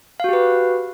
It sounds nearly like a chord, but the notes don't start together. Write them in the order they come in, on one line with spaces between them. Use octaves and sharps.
F5 F#4 G4 B4